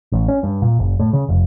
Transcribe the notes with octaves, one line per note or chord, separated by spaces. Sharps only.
A1
C#4
G2
A#2
F#1
A2
C#3
F1